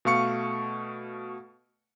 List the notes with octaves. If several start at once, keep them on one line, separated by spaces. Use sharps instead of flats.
B2 A3 F5 C#6 C#7